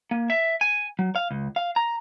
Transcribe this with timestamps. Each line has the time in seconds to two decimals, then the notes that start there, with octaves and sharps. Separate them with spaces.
0.11 A#3
0.30 E5
0.61 G#5
0.99 F#3
1.16 F5
1.31 C#2
1.56 F5
1.76 A#5